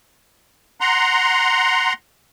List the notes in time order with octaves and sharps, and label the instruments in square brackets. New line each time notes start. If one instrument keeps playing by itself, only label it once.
[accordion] F#5 A#5 C6